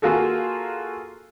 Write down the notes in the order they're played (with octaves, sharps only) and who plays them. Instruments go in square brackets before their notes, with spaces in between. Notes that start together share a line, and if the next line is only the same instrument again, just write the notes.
[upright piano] A#3 F4 F#4 G#4 A4